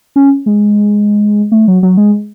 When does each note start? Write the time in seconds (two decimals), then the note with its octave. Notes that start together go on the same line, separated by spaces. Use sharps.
0.16 C#4
0.46 G#3
1.52 A3
1.68 F#3
1.83 F#3
1.97 G#3